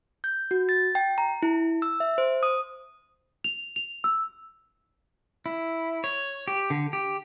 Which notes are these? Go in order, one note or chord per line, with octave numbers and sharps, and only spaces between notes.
G6
F#4
A6
G5
A#5
E4
E6
E5
C5
D#6
F7
F7
E6
E4
C#5
G4
D3
G4